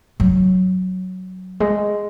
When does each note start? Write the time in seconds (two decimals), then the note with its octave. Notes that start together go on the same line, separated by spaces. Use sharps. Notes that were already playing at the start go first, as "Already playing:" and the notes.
0.20 F#3
1.60 G#3